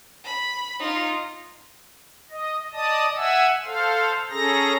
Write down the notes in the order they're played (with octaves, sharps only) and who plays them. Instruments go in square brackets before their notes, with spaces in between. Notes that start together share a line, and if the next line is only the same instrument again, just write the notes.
[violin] B5
D#4 F4
[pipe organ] D#5
D5 D#5 A5 D#6
E5 F#5 G#5 E6
A4 C5 F5
C#4 G#4 A4 A#5 A#6